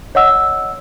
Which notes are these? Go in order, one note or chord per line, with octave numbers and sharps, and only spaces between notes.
C#5 D#5 F#5 E6